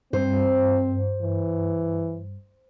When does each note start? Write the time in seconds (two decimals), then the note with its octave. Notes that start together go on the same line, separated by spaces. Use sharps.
0.13 G2 C4 C5
1.21 E3